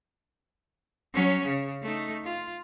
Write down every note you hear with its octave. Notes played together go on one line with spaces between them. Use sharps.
F#3 C#4
C#3
A3 D#4
F4